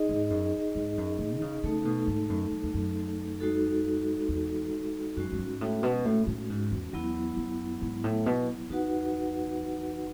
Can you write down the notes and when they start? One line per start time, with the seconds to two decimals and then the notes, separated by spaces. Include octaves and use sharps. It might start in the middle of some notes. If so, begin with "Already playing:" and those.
Already playing: D#4 G#4 D#5
0.09 G#2
0.30 F#2
0.75 G#2
0.97 F#2
1.19 A2
1.36 D#3
1.42 C#3
1.64 C#3 A3 D#4 A4
1.85 B2
2.07 G#2
2.29 F#2
2.51 F#2
2.63 E2
2.74 F#2
3.40 G#3 D#4 F#4 A4
4.29 E2
5.16 F#2 G#3 C#4 F#4
5.32 F#2
5.39 G#2
5.61 A2
5.83 B2
6.05 A2
6.27 A2
6.50 G#2
6.72 E2
6.93 E2 F#3 B3 E4
7.37 F#2
7.82 G#2
8.04 A2
8.26 B2
8.70 E2 D#4 F#4 B4 F#5